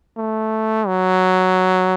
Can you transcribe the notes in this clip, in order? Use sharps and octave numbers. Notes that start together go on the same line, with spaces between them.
A3
F#3